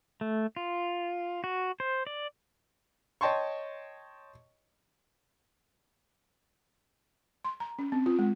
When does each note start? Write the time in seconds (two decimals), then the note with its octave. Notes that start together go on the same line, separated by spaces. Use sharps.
0.21 A3
0.56 F4
1.44 F#4
1.80 C5
2.07 D5
3.21 C#5 D#5 G5 A5 C6 C#6
7.45 C6
7.60 A#5
7.79 C#4
7.92 C4
8.06 F4
8.19 G#3